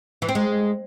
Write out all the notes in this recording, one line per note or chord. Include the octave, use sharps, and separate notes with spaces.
E3
C4
G#3